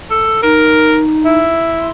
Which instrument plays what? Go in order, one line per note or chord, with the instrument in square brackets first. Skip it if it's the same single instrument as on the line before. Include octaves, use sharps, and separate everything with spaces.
[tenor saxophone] A4
[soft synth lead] D#4 [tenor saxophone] A#4
[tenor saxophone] E4
[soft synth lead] C6